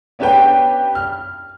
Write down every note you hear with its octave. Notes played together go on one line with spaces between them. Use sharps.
B3 C#4 D4 G4 B4 G5
F6